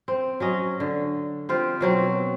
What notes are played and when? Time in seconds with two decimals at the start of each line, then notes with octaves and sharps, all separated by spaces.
0.08 C4
0.40 F#3 C#4 D#5
0.80 D3
1.49 C4 F4 G4
1.81 B2 F#3 C4